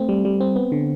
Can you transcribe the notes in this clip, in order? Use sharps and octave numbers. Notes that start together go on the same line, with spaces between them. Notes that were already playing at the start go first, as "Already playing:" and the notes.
Already playing: A3 C4
G3
G3
C4
B3
D3